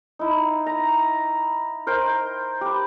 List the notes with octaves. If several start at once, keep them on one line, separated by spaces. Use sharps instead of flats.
D#4 E4
A#5
A#4 C5 G5 A#5
G4 B4